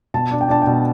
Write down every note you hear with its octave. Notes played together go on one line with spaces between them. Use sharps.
B2 A5
D4
G5
D4 A5
B2 G5